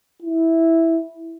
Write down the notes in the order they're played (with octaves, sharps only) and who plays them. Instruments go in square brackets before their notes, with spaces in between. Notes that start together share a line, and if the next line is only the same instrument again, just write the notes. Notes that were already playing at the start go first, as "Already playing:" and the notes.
[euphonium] E4